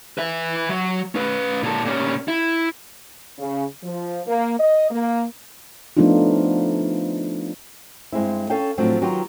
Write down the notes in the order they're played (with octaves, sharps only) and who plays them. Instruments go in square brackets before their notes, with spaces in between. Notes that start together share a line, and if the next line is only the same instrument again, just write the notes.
[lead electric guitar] B4 E5
F#3
C#4 B4
A#2 A4
A#2 C#4
E4
[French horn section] C#3
F3
A#3
D#5
A#3
[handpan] F3 A3 B3 D4 D#4 F4
[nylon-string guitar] G2 G#3 C4 E4
C#4 A4 C#5 F5 G5
A2 F3 F#3 C4 D4
D#3 F#3 B3 F4 G4